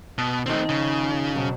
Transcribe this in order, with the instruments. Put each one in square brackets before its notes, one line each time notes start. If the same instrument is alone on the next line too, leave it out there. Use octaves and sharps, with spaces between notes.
[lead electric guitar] B2
[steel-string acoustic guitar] D#3 F3 D#4 [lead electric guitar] A3 C4
[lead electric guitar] C#3
[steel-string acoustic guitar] F2 B2 F#3